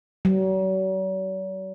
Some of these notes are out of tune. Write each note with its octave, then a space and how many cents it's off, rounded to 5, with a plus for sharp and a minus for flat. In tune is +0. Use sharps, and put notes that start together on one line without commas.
F#3 +45